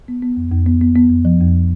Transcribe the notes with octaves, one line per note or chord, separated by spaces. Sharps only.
B3
B3
F2
F2
B3
B3
B3
F2
F3
F2